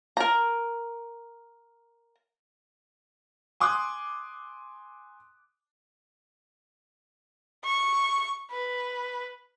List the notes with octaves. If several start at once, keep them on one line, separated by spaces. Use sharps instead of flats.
A#4 A#5
G#5 C6 D6 D#6 F#6
C#6
B4